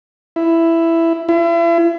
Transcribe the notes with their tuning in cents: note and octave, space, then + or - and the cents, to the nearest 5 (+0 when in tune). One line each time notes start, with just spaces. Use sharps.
E4 +10
E4 +40